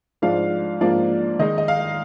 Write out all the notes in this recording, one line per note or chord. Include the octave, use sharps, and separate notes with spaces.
G#2 F3 G#3 D4 F5
G#2 F3 A#3 D4 F4 D5
D#3 G#3 D#4 D#5
D#5
F5